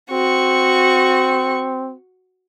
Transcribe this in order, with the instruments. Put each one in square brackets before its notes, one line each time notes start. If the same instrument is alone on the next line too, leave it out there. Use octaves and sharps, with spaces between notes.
[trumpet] C4 [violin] F#4 C#6